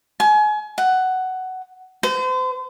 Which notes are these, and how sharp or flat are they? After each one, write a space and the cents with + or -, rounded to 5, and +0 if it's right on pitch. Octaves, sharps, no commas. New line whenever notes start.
G#5 +30
F#5 +10
C5 -40